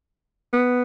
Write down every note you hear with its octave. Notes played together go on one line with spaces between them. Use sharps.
B3